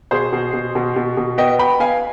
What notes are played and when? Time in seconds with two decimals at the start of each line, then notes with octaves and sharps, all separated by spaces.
0.11 B2 G#4 C5
0.33 B2
0.53 B2
0.75 B2
0.96 B2
1.17 B2
1.38 B3 D#5 G5
1.59 B3 G5 B5
1.80 B3 F5 G#5